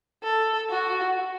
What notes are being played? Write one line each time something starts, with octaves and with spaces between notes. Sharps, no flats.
A4
F#4